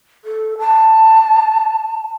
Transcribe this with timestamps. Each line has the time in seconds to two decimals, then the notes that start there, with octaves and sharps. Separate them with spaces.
0.25 A4
0.59 A5